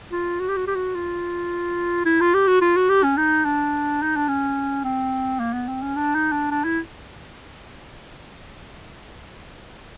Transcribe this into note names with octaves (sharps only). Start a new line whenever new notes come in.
F4
F#4
G4
F#4
G4
F#4
F4
E4
F4
G4
F#4
F4
F#4
G4
C#4
D#4
D4
D#4
D4
C#4
C4
A#3
B3
C4
C#4
D4
D#4
D4
D4
E4